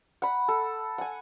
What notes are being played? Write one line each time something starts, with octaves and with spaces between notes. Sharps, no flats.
F#5 B5
A4
F#5 G#5